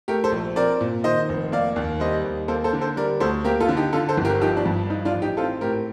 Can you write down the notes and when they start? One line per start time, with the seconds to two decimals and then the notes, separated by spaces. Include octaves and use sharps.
0.08 A3 G4 A#4
0.24 A4 C5
0.32 A#1
0.56 C4 A#4 D5
0.81 A#2
1.04 D#3 C5 D#5
1.29 F1
1.52 A#3 D5 F5
1.76 D#2
2.00 G3 C5 D#5
2.25 D#2
2.48 A#3 A4 C5
2.64 A4 C5
2.73 D3
2.81 A4 C5
2.97 G3 A#4 D5
3.20 D2 A4 C5
3.44 A#3 G4 A#4
3.61 F4 A4
3.69 D3
3.77 D#4 G4
3.93 D3 F4 A4
4.09 A4 C5
4.17 G1
4.25 G4 A#4
4.41 F3 D#4 G4
4.57 D4
4.66 G2
4.90 F3 D#4
5.05 D4 F4
5.13 A1
5.22 D#4 G4
5.37 C4 F4 A4
5.61 A2 G4 A#4